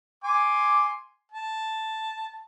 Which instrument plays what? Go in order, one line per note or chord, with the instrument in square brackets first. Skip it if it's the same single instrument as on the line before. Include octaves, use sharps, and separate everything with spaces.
[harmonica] G#5 C6 D6
A5